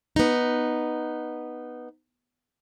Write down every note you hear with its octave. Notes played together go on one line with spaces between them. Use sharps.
B3 D#4